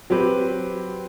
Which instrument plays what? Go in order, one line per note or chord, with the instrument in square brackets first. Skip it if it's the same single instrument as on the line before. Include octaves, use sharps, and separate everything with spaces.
[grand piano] F#3 C4 G4 B4